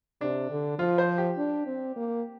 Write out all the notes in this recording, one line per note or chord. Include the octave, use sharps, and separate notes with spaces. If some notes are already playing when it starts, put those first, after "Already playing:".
C3 D4
D3
F3 F4
C5
G4
D4
C4
A#3